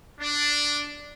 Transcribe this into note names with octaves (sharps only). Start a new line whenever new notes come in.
D4